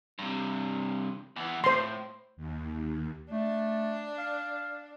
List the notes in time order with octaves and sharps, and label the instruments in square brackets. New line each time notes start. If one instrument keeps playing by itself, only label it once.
[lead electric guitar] G2 C3
E2 E3
[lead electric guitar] A2 [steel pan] C5 C6
[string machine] D#2
[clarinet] A3 [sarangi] D4
[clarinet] F5